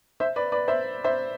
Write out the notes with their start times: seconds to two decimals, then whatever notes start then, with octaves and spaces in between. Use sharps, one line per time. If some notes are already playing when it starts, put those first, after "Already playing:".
0.20 C5 E5
0.36 B4 D5
0.52 B4 D5
0.68 C5 E5
1.04 C5 E5